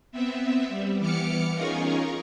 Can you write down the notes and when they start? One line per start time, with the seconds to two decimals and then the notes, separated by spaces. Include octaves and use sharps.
0.12 B3 C4 E5
0.69 G3
0.99 E3 B3 D6 F6 C#7
1.54 C#4 D#4 F4 G#4 A#4 C#5